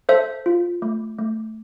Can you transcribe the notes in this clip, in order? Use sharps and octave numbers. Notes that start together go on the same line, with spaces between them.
A4 C5 E5
F4
A3
A3